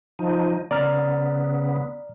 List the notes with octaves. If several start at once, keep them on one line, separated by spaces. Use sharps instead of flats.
F3 D#4
C#3 B3 D5 A#5 F6